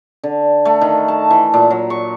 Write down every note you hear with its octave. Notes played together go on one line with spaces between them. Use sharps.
D3
A3
D#3
A5
E3
A#2
F#3
C#6